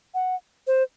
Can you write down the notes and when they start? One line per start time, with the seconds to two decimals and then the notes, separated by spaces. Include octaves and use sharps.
0.14 F#5
0.67 C5